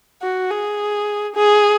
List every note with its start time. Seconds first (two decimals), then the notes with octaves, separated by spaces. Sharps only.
0.22 F#4
0.51 G#4
1.35 G#4